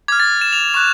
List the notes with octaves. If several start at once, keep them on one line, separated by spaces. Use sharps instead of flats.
D6 F6 G#6
A6
E7
F7
C#6 F#6 E7